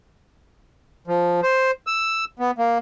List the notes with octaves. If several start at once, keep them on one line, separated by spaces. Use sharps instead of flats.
F3
C5
E6
B3
A#3